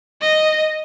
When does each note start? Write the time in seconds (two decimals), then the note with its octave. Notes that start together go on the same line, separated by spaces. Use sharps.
0.21 D#5